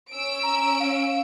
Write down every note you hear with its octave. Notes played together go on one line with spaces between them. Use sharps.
C#4 E6 D7
A#5
F5